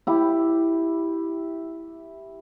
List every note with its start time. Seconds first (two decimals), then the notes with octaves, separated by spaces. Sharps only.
0.07 E4 G4